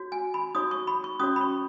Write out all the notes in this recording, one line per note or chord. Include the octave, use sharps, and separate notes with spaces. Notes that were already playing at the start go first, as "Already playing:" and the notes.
Already playing: F#4 C#5
G#5
B5
D#4 F#4 C#5 D#6
C#6
B5
C#6
C#4 F#4 C#5 D#6
B5
C#6